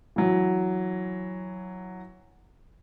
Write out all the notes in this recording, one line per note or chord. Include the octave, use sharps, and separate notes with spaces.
E3 F#3